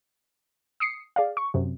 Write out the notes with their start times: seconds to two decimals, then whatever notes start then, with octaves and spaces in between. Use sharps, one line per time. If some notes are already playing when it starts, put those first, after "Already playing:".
0.80 D#6 C7 C#7
1.16 G#4 D5 F5
1.37 C#6
1.54 F#2 C3